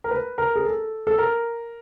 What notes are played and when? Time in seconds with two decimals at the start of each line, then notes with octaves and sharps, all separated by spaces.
0.04 A#4
0.11 B4
0.38 A#4
0.56 G#4
0.65 A4
1.07 A4
1.18 A#4